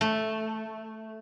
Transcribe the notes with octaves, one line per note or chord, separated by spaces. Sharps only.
A3